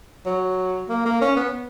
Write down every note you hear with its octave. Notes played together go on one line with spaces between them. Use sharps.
F#3
A#3
A#3
C#4
B3